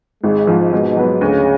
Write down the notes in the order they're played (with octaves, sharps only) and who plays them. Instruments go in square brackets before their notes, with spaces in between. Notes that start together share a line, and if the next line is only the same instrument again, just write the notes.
[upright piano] G#1 [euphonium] G#3
[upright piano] G#2 F3
[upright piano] G#2 [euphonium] B2
[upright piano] F#3 B3
[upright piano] D2 [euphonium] C#3